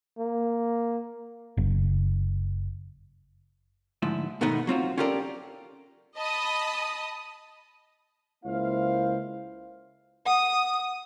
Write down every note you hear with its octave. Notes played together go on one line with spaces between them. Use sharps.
A#3
F#1
D2 G#2 F3 E4
G#2 B2 D#3 A3 B3 D#4
F#3 C4 F4 F#4
C#4 F4 G4 A4 A#4 D5
D#5 A5 B5 D#6
C#2 A#3 E4 C5 F5
F#5 D#6